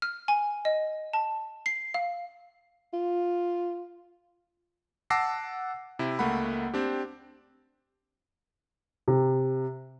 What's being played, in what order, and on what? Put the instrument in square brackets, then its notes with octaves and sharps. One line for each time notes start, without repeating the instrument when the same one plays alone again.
[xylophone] F6
G#5
D#5
A5
C7
F5
[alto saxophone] F4
[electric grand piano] F#5 A5 D6 E6 A#6 C7
C3 E4
C#2 A3 A#3 F#5 B5
C4 D4 G4
[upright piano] C3